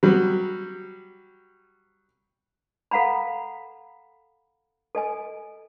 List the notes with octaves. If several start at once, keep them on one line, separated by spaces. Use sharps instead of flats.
F#3 G3
A4 F5 F#5 A#5 B5
A4 D#5 G#5